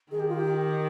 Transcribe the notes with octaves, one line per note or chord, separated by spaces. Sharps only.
D#3 G#4
G4
F4
G4